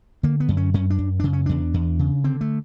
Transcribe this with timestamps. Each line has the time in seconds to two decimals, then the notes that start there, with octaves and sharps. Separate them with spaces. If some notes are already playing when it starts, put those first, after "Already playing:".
0.23 D3 A#3
0.40 B3
0.49 F#2
0.57 C#4
0.74 F#2 C#4
0.90 D4
0.99 F#2
1.20 C#3 D4
1.33 C#4
1.46 E2 D4
1.74 E2
1.99 C#3
2.24 D3 C4
2.41 A3